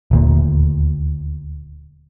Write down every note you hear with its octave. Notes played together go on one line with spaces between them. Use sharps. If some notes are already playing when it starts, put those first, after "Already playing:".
D#1 D2 A#2